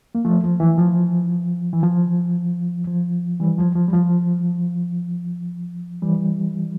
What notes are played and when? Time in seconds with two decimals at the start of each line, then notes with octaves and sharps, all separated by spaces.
0.15 A#3
0.25 F3 A3
0.44 F3
0.60 E3
0.78 F3
1.73 E3
1.83 F3
2.87 F3
3.40 E3 G3
3.58 F3
3.75 F3
3.88 G3
3.93 F3
6.02 E3 G3